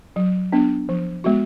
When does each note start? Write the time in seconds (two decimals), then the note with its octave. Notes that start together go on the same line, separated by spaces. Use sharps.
0.16 F#3
0.52 B3 D4
0.89 F3
1.24 G#3 B3 F#4